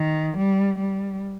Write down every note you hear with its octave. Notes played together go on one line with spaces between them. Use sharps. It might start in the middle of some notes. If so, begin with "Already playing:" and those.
Already playing: D#3
G3
G3